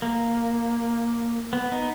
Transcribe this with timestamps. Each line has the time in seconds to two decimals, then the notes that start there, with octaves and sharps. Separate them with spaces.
0.02 A#3
1.53 B3
1.72 B3 D#4